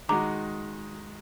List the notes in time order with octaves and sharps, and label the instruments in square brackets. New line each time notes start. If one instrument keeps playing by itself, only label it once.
[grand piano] D#3 G#3 D#4 F#4 [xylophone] A#5 D6